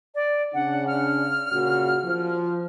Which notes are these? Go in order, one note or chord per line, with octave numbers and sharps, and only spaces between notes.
D5
C#3 D4 F#5
F6
A#2 C#3 F#4
F3